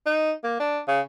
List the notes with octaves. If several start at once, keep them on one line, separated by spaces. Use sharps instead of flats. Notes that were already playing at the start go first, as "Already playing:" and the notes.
D#4
A#3
D4
C#3